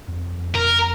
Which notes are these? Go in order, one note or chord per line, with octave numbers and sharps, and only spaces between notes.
F2
A#4